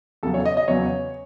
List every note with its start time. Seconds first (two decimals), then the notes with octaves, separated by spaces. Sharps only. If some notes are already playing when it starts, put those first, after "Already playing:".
0.23 E2 C#3 F#3 A4
0.34 C#5
0.46 D#5
0.57 D#5
0.68 E2 C#3 F#3 C#5